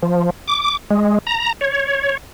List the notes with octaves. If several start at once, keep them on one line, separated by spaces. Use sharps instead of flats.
F3
D6
G#3
A#5
C#5